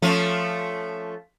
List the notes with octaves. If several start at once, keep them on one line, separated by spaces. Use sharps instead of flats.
F3 A3 C#4